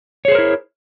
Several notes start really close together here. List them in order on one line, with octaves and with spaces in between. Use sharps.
C#5 G#4 C5 A#4 E4